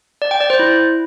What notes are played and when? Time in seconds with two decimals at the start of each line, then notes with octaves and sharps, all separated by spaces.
0.22 D5
0.31 G5
0.40 D5
0.50 C5
0.59 E4